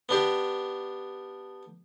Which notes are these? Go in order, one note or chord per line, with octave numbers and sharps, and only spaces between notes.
B3 D4 G4